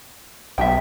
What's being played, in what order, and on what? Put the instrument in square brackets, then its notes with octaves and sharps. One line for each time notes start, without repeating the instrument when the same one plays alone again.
[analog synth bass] B1 [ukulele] E5 G5